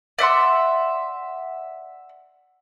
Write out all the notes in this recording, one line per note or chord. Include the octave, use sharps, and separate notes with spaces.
D5 E5 F#5 C6